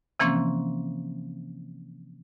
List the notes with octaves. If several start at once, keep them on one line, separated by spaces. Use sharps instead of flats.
C3 E3 F3 A#3 C4 C#4